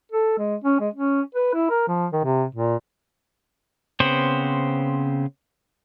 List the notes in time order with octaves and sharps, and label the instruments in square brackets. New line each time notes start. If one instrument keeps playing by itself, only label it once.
[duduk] A4
G#3
C#4
G#3
C#4
B4
E4
A#4
F3
D#3
C3
A#2
[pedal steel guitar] C#3 B3 C4 C5